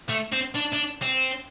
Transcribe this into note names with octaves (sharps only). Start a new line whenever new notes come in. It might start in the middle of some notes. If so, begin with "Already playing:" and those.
A3
C4
D4
D4
C4